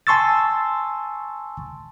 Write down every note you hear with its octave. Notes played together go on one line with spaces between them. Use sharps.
G#5 A5 C6 C#6 E6 A6